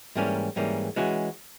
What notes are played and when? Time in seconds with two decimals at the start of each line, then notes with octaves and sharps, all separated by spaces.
0.16 G#2 E3 G3 A#3 C#4
0.56 G#2 E3 G3 A#3 C#4
0.96 E3 G#3 C#4 F#4